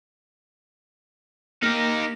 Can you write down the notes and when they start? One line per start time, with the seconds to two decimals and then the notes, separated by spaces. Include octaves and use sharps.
1.62 A#3 D#4 G4